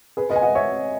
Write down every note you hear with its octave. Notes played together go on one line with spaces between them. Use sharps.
G#4 B4
B4 D#5
G#5
D#5 F#5
C#5 E5